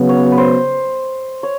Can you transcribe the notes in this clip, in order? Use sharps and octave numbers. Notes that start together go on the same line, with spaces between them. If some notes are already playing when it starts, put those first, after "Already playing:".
Already playing: C#3 F#3 B3
C#5
B4
C5
C#5